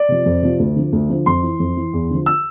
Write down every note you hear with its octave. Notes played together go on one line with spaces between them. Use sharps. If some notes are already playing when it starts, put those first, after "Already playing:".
Already playing: D5
C3 F3
F2
C3 F3
D2
D3 F3
D2
D3 F3
F2 C6
E3
F2
E3
E2
D3 F3
E6